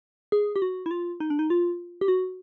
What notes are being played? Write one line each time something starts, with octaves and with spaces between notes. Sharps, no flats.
G#4
G4
F#4
E4
F4
D#4
D4
D#4
F4
G4
F#4